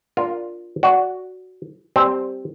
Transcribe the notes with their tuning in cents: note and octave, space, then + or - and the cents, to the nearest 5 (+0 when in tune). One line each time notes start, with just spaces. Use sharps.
D4 -5 F4 +0 A#4 +0
F#4 +0 D5 -20
G3 +0 C4 +0 A5 +35